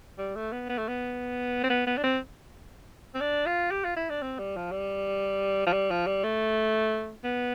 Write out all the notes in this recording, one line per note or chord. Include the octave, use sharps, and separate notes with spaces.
G3
A3
B3
B3
A3
B3
C4
B3
B3
D4
C4
C4
D4
F4
G4
F4
E4
D4
C4
G3
F3
G3
F3
G3
F3
G3
A3
B3